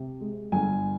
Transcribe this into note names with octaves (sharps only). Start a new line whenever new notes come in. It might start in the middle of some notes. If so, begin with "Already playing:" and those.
Already playing: C3
G#3
G1 G#5